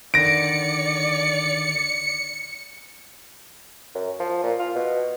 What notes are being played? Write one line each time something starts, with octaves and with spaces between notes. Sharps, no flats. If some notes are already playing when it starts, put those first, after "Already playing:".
D3 D#3 D5 A#6 C#7 D7
F#2
F3
A#2
F4
B2